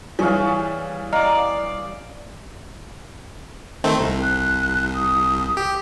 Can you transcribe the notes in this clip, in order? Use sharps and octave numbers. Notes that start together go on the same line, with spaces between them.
E3 G3 G#4 C#5 F5
D5 D#5 F5 A#5
D#3 A3 C4
C2
F#6
D#6
G4